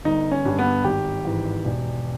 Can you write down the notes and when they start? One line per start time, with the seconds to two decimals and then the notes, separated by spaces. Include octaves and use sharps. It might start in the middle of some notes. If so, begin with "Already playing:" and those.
0.04 G1 D#4
0.31 C#4
0.45 G2 G3
0.59 B3
0.84 G#1 G4
1.24 G#2 E3
1.65 E1